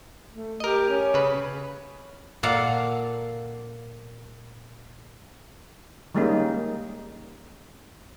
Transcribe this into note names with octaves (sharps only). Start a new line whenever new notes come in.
A3
G4 A#4 D#5
C#4
C#3 B4
A#2 A#3 A4 F5 F#5 A5
D#3 G3 G#3 A#3 C#4 D#4